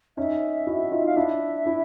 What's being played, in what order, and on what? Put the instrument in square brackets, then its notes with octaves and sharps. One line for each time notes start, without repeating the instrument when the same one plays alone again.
[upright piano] C#4 D#4 [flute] E5
[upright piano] E4 F#4
D#4 F4
[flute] F5
[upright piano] D4 E4 [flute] E5
[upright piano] D4 E4